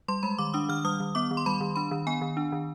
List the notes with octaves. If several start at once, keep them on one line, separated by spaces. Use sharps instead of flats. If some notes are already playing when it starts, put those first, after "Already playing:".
G3 C6
G#3 B5
D#3 D6
D4 D#6
D#3 F6
G3 D#6
D#3
B3 D6
D#3
C6
G3 B5
D#3
D4 B5
D#3
B3 G#5
D#3
D4
D#3